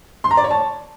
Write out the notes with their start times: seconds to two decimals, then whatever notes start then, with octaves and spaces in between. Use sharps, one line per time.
0.24 C6
0.31 A#5
0.37 D5
0.44 C#5
0.51 A5